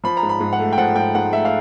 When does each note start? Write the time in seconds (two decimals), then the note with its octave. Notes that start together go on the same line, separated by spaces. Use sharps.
0.04 F3 B5
0.17 A#5
0.23 G#2
0.29 B5
0.40 G#2
0.53 F#5
0.59 A3
0.73 G5
0.78 F3 F#5
0.96 G#2 G5
1.15 G#2 F#5
1.33 A3 E5
1.45 F5